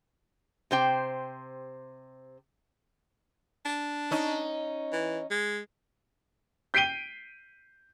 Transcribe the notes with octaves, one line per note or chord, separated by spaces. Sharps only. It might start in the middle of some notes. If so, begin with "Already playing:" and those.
C3 C5 G5
D4
C#4 D#4
E3
G#3
G6 B6 C7 D7 D#7 G7